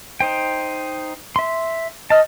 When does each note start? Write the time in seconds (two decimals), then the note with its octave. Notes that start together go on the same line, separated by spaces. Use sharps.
0.20 D#4 C5 G5
1.36 E5 C6
2.10 D#5 A5 F6